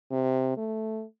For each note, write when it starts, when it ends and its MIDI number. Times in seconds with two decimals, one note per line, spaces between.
0.11 0.53 48
0.57 1.04 57